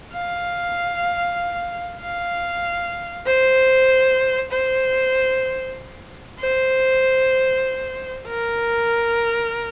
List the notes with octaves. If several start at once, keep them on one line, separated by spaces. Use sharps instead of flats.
F5
F5
C5
C5
C5
A#4